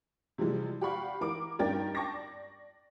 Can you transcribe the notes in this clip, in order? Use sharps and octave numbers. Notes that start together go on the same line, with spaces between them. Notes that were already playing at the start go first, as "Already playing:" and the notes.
C3 E3 F3 G3 G#3
G4 D5 F5 F#5 B5 C#6
E3 A#4 D6 D7
G2 C#4 D#4 A#4 G5 A6
G5 A5 C#6 D6 A#6
D5